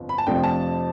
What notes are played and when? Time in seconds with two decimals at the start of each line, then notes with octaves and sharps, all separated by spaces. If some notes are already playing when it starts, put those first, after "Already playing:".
Already playing: G1 F2
0.09 B5
0.18 A5
0.27 F2 C3 F3 A3 D4 G5
0.43 A5